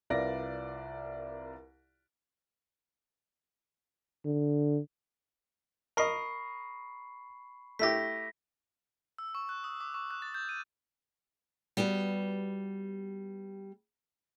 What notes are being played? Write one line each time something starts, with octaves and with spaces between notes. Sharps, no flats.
C2 F4 A#4 B4 D5 A#6
D3
A#4 D#5 B5 C#6 C7
A3 E4 G4 A#6 B6
E6
C#6
F#6
D#6
D6
C#6
F#6
A6
G6
D#7
G3 B3 F#4 G4